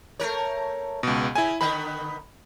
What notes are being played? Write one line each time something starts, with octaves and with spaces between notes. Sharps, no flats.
A3 A#4 C#5
C#2 B2
C#3 E4 G#5
D3 D#3 B3 B5